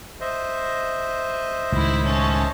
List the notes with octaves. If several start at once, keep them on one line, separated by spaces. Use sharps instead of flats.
C5 D#5 E5
C#2 A2 D#3 E4
C#4 A5